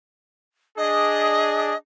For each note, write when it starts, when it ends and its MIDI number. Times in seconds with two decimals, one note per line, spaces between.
0.78 1.74 62
0.78 1.74 68
0.78 1.77 75